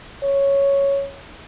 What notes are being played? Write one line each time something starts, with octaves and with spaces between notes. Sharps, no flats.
C#5